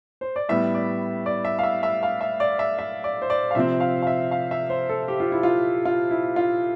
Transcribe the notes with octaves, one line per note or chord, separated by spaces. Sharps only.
C5
D5
A2 G3 B3 E5
D5
D5
E5
F5
E5
E5
F5
E5
D5
E5
E5
D5
C5
D5
F5
C3 F3 C4 E5
F5
F5
E5
F5
E5
C5
A4
G4
F4
E4
F4
F4
E4
F4